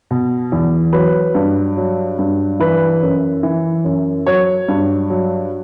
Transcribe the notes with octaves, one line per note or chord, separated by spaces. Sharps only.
B2
E2
F#3 B4
G2
F#3
G2
E3 B4
F#2
E3
F#2
F#3 C#5
G2
F#3